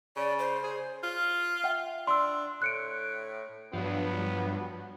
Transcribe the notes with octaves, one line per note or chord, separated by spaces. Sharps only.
C#3 D5
C5
G#4
F4
E5 F#5 G5
D4 C6 E6
A2 F#6 C#7 D7
G2 F3 F#3 B3